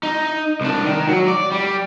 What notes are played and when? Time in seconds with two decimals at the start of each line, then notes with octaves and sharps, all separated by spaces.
0.03 D#4
0.61 C2 D4
0.85 D#3
1.08 F#3
1.28 D5
1.52 G3